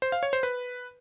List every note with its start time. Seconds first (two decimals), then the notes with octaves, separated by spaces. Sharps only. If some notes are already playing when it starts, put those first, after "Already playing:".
0.02 C5
0.12 F5
0.23 C#5
0.33 C5
0.43 B4